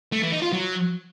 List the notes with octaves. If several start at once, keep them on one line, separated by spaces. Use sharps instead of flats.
A3
E3
D#4
F4
F#3